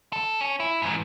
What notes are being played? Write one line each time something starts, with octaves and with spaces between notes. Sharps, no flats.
A4
C#4
E4
G#2 E3